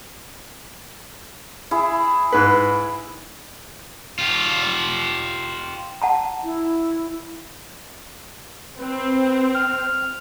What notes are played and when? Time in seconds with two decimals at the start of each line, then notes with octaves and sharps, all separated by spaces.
1.71 E4 G#4
2.33 G#2 B4
4.19 F4 G4
6.02 F#5 A5 A#5
6.44 E4
8.79 C4 B4
9.55 F6